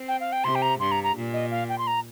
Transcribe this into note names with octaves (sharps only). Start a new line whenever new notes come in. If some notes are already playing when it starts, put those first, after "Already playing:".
Already playing: C4
G5
F5
G5
C3 C6
G5
A#5
G2 C6
A#5
A#5
A#2
D#5
F5
G5
C6
A#5